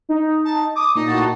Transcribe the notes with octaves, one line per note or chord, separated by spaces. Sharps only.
D#4
A5
D6 D#6
A#2 D#4
A2 F#4 A5